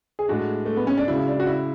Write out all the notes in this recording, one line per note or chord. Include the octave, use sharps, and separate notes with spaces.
G#4
A2 G#3 D4 F#4
A3
B3
C#4
D4
C#2 C#3 F#3 E4
D4
F#4
E4